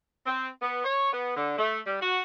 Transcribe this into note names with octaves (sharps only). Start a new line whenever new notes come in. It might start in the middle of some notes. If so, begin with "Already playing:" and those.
C4
B3
C#5
B3
D3
A3
G3
F#4